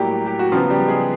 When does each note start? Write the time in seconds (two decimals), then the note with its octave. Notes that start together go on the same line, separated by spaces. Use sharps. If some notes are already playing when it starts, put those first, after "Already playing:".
Already playing: A2 F#3 G3 A#3 G4
0.26 G4
0.39 F#4
0.52 C#3 F3 F#3 B3 F4
0.70 G3 G4
0.88 G#3 G#4